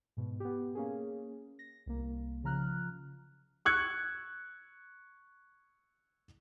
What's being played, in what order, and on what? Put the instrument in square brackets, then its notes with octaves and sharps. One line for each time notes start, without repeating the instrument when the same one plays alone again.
[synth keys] G#2 B2
B3 G4
A#3 C#4 G#4
A#6
C2 A#3
C#3 F3 A#5 F6 F#6
[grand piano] C#6 E6 F#6 G#6 C#7